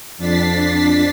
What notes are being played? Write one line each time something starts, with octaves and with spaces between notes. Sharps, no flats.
F2 D4 A6 B6 C7